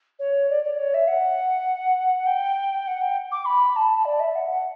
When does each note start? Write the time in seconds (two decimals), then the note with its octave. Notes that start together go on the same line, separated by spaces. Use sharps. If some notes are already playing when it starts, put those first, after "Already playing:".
0.19 C#5
0.49 D5
0.64 D5
0.78 C#5
0.94 E5
1.08 F#5
2.26 G5
2.87 F#5
3.01 G5
3.31 D6
3.45 B5
3.76 A5
4.05 D5
4.20 E5
4.35 F#5
4.50 F#5